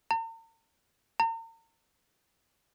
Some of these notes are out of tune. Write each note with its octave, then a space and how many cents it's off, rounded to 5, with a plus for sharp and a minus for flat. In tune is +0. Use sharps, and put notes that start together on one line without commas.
A#5 -45
A#5 -40